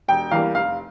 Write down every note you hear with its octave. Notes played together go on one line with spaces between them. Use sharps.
E1 G5
E2 E3 G3 A#3 F5
F1 F5